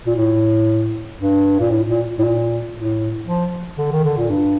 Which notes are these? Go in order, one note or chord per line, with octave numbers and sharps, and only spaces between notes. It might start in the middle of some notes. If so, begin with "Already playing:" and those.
A#2
A2
G2
A#2
A2
A#2
A2
A#2
A2
F3
D3
D#3
D3
A#2
G2